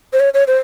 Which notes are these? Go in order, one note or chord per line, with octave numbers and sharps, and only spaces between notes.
C5
C#5
C#5
C5